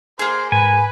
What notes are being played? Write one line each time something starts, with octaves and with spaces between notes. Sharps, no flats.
A#3 G#4 C5
G#2 B4 G#5